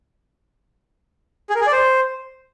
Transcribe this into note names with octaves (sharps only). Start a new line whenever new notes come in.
G#4
A#4
G#4
D5
C5